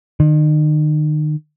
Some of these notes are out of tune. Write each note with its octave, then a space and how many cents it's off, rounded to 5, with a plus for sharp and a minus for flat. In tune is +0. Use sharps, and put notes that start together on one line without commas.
D#3 -35